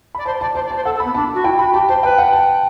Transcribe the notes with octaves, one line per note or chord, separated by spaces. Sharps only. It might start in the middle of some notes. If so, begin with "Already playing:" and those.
D5 B5
C5 A5
D5 A5
C5 A5
D5
A5
C5
A4 F#5
A4
B3 B5
D4 A5
F#4
E4 G5
F#4 B5
G4 A5
C5 A5
B4 G5
F#5
A5